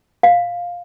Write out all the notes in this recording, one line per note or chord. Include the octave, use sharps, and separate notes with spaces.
F5